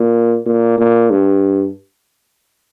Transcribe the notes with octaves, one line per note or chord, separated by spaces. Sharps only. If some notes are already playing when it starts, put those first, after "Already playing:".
Already playing: A#2
A#2
A#2
G2